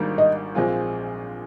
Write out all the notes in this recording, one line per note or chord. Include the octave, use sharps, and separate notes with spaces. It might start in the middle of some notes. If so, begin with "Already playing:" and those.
Already playing: G#1 G#2 G3 A#3 D4
D#5
A#1 A#2 G#3 C4 F4